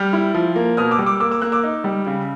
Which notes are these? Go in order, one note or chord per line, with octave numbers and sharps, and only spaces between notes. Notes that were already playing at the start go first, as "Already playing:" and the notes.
Already playing: G3 F6 G6
E4
F3
A#3
B2 D#6 F6
D6 E6
G3
D6 E6
A#3 D6 E6
D6 E6
A#3 E6 F#6
D6 E6
D#4
G3
C#3